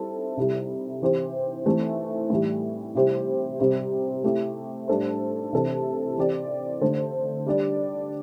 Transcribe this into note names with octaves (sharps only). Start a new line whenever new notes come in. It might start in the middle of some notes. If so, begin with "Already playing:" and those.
Already playing: G3 C4 E4 A4
C3 G3 E4
E3 C4 G4 C5
E3 A3 C4 E4 A4
A2 E3 G3
C3 G3 E4 G4 C5
C3 G3 C4 G4
A3 C4 E4 G4
A2 G3 D4 A4 C5
C3 E3 C4 A4
E3 C4 G4 D5
D3 A3 D4 A4 C5
G3 D4 G4 D5